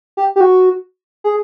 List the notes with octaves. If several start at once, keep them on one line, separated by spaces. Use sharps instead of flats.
G4
G4
F#4
G#4